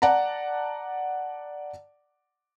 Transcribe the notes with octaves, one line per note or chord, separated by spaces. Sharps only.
D5 F#5 A5 A#5